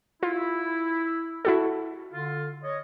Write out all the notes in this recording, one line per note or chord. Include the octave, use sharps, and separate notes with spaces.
E4 F4
E4 F#4 A4
D3 F4
C#5 D#5